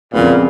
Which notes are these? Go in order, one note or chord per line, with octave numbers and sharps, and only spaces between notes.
F2 A#2 C#3 G#3 B3